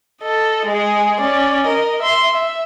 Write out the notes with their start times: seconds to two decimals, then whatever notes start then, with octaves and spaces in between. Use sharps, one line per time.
0.22 A4 D#5
0.66 G#3 G#4
1.20 C#4 D5
1.65 A#4 D#5
2.02 E5 C6
2.34 E5